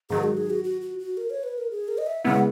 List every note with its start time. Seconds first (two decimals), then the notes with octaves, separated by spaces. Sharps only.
0.10 G#2 D#3 F#3 G#4
0.24 F#4
0.37 G#4
0.50 F#4
0.64 F#4
0.81 F#4
0.99 F#4
1.17 A#4
1.30 C#5
1.43 B4
1.58 A#4
1.71 G#4
1.88 A#4
1.98 D#5
2.07 E5
2.24 C#3 G#3 B3 E4 F#5